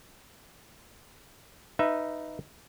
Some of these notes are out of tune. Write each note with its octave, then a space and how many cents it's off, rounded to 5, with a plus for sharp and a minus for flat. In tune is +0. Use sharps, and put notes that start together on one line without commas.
D#4 +0 B4 +0 E5 +15